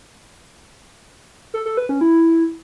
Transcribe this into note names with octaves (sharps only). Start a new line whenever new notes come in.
A4
A4
B4
C#4
E4